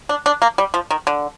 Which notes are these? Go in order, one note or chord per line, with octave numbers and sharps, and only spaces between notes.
D4
D4
A#3
G3
F3
D#3
D3